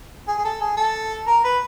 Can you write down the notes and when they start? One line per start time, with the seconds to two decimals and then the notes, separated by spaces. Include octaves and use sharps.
0.28 G#4
0.38 G#4
0.44 A4
0.61 G#4
0.77 A4
1.27 A#4
1.44 B4